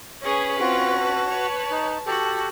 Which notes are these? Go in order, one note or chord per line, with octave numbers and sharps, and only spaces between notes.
C#4 G#4 B4 C#5
C4 F4 F#4
A5
B4 C#5
D#4
F#4 G4 A4